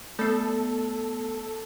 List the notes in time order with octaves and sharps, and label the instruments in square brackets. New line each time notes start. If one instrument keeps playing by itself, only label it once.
[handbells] A3 B3 [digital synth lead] A4